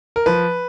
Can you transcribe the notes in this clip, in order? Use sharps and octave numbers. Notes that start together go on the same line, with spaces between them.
A#4
F3 B4